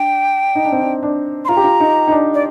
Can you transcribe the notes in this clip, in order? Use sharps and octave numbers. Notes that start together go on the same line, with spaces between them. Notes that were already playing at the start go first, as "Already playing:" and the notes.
Already playing: D4 G5
D#4
D4
C4
D4
D4
C6
F4 A#5
G4
F4
D#4
D#4
D4
D5